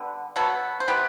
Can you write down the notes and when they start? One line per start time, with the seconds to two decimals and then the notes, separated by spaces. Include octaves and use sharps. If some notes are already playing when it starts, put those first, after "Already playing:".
Already playing: D3 G3 B3
0.36 B2 F#3 B3 F#4 A4
0.80 C5
0.88 C3 E3 B3 G4 B4